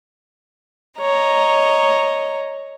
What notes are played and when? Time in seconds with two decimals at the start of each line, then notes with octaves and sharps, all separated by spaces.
0.99 C#5 D#5 A#5